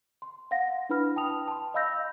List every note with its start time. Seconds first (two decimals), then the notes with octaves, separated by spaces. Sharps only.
0.22 C6
0.51 F5 F#5 A#6
0.89 D4 E4 B4 B5 F6
1.16 G5 A5 D#6 F7
1.48 A5 C6
1.74 D#5 F5 B5 E6 G6 A#6